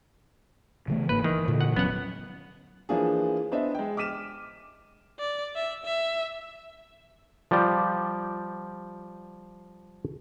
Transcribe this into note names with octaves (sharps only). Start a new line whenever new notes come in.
C#3 E3 A3
G1 G#2 A#3 B4
D#3 E3
A#2 D3 E3
F#5
E1 F#3 B3 C#4 F#5
E3 F3 A#3 D4 G#4
B3 D4 C5 D#5 E5
G#3 G5
D6 F6 B6 D#7 E7
D5
E5
E5
F3 G3 D5 G5